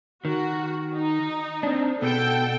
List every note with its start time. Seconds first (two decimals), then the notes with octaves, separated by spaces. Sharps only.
0.25 D#3 F#4
0.95 D#4
1.63 C4 D4
2.02 B2 A4 G5